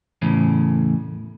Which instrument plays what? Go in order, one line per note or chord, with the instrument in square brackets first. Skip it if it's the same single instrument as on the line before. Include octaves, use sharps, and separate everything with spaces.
[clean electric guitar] E2 A2 C#3